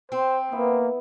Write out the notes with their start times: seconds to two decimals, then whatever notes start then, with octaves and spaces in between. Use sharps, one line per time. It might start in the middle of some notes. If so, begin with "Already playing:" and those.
0.12 C4 C5
0.52 A#3 B3 E4